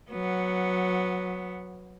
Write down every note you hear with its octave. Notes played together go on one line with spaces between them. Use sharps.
F#3 B3